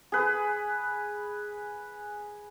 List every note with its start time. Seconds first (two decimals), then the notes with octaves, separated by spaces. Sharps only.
0.12 G#4 B4